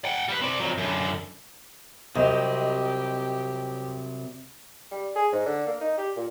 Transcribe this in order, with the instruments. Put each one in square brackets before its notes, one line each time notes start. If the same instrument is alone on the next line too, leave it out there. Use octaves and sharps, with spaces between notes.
[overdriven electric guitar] F#5 G5
G3 B4
C4 D5
F2 F#3
F#2 D3
[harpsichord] C2 [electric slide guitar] C3 F#3 C4 [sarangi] G4 [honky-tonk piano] D#5
[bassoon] G3
G#4
G#2
D3
A#3
D#4
G4
A#2